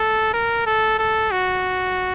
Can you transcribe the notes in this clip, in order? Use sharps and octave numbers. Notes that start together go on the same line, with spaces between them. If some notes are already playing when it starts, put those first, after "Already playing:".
Already playing: A4
A#4
A4
A4
F#4